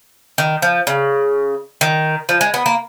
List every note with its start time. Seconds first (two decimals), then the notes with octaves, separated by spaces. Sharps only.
0.38 D#3
0.62 F3
0.87 C#3
1.81 D#3
2.29 F3
2.41 G#3
2.54 B3
2.66 A#3